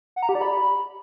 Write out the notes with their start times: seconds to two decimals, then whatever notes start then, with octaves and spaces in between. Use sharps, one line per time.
0.16 F#5
0.23 A#5
0.29 G4
0.35 D5
0.41 B5